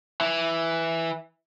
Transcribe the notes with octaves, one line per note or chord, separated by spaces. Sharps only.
E3